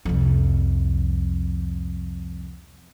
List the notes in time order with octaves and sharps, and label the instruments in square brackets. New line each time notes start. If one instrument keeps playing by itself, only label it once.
[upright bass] C2 F2